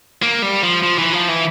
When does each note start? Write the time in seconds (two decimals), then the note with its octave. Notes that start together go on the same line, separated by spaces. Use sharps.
0.22 A#3
0.42 G3
0.63 F3
0.83 F3
0.98 E3
1.13 F3
1.29 E3